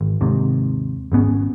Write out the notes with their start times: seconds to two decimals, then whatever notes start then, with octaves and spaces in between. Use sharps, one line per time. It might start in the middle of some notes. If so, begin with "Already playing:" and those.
0.01 G#1
0.21 D#2 G#2 C3
1.12 G#1 G#2 B3 C#4